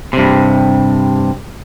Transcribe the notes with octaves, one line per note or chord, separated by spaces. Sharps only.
G2 C3